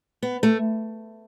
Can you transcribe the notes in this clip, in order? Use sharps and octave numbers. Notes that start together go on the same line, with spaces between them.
B3
A3